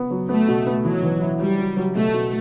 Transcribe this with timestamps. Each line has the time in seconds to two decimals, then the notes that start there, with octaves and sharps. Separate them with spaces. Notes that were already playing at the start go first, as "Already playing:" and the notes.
Already playing: B3
0.11 F#3
0.29 A3 B3
0.48 B2
0.67 B3
0.84 E3 F#3
1.03 E3
1.21 E4
1.40 F#3 G3
1.58 F#3
1.77 F#3
1.95 B2 A3
2.14 B2